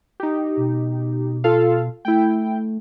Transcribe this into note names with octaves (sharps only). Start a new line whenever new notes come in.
D#4 G4
B2
F4 A4 F5
A3 E4 G5